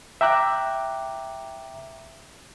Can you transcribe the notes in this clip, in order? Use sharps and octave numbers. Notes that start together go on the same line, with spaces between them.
E5 G5 A#5 D6 F#6